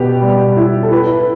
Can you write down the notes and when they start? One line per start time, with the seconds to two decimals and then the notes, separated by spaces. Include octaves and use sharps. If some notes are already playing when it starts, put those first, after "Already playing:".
Already playing: B2 B3 G4
0.22 G3
0.57 E4
0.83 A4
0.91 E4 B4